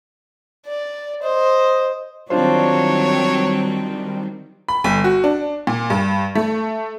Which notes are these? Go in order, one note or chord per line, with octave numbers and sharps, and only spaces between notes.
D5
C5 D#5
D#3 F#3 G3 C4 D4 F4 C5 C#5
B5
G1
F#4
D4
A#2
G2
A3